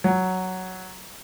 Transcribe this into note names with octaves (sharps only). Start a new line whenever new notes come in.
F#3